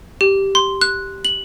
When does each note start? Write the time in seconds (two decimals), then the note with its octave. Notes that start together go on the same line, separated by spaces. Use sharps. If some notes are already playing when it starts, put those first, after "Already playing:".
0.21 G4
0.55 C6
0.81 F#6
1.25 F#7